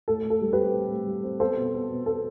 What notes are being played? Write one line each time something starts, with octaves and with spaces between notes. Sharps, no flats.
A2 A4
A2
A4
G3
G4 B4
C4
A2
A2
G3
C4
B3 A4 C5
B2
B3
B2
B3 A4